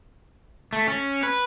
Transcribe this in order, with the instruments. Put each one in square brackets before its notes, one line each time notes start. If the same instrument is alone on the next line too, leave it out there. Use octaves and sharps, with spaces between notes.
[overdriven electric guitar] A3
C#4
B4